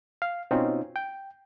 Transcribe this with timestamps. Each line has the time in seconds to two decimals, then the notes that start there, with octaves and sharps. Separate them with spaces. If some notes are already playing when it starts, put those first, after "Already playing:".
0.22 F5
0.51 B2 C4 C#4 D#4 F4
0.96 G5